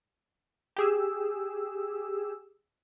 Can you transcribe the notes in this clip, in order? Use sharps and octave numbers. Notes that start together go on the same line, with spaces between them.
G4 G#4 E6